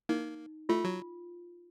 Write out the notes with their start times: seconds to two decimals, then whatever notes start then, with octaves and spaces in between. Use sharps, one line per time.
0.09 A#3 D#4
0.69 A3 F4
0.84 F#3